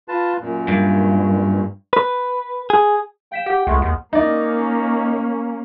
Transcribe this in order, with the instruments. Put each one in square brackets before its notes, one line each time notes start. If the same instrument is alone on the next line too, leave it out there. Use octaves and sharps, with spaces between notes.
[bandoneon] F4 B4 A5
F#2 A#2
[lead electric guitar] G2
[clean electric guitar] B4
G#4
[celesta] F5 B6 E7 [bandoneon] G5
[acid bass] G4 [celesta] F#5
[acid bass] C#2 [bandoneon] G#3 A3
[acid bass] D#2 [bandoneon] G#3
[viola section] A#3 C#4 [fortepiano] D#4 D5